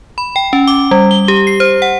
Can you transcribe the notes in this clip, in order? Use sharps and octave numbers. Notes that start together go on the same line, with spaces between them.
B5
G5
C#4
D6
G3
G7
G4
C7
C5
F#5